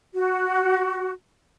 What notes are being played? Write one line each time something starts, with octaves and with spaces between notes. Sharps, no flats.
F#4